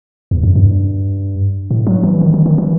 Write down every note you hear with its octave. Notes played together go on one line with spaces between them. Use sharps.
E2
F#2
G2
A2
F#3
E3
D#3
D#3
D#3
E3